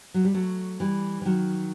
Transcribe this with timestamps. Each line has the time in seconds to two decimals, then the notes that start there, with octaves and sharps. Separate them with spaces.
0.14 F#3
0.25 G3
0.34 F#3 A3
0.80 E3 G3
1.21 E3
1.25 D#3 F#3